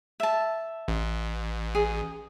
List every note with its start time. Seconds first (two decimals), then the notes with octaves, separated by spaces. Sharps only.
0.20 E5 A5
0.88 A1
1.75 G#4